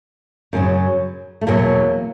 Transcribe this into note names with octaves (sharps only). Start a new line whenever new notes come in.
F#2 C#3 F#3
A3
E2 B2 F#3 A#3